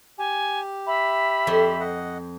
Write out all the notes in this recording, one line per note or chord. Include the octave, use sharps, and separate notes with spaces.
G4 G#5
E5 B5
F2 C5 C6
D#5 F#5